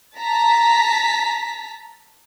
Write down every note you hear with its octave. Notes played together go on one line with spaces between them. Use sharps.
A5 A#5 B6